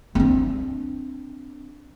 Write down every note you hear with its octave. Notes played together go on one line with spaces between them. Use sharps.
C4 D4